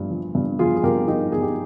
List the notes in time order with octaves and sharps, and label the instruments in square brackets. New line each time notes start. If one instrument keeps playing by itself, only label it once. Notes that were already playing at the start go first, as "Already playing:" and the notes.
Already playing: [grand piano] G2 F3
F3
G2
F3 F4 G#4
G#4
G2 G4 A#4
F3 D#4 G4
G2 G#4
G4